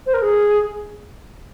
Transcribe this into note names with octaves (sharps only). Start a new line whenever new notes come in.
C5
A#4
G#4